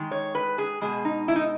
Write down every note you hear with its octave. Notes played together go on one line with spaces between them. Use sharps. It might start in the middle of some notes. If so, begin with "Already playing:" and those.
Already playing: D#3 G#3
C#5
B4
G#4
B2 G#3 G#4
D#4
E4
D#4